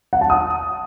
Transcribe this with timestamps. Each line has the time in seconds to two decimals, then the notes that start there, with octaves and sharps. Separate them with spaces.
0.13 F#5
0.21 A5
0.30 D#6